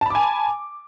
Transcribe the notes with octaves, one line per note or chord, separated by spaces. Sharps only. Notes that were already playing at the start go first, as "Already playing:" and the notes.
G#5 A5 B5 D6